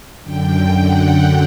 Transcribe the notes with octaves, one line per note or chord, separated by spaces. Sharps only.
F#2 D3 G5
F#5